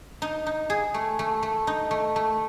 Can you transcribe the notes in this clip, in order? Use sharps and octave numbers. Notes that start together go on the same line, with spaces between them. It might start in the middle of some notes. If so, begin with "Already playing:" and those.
D#4
D#4
G#4
A3
A3
A3
D#4
A3
A3